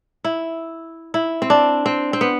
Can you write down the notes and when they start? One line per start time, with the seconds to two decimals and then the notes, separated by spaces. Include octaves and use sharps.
0.24 E4
1.14 E4
1.42 C4
1.50 D4
1.86 C4
2.13 C4
2.21 B3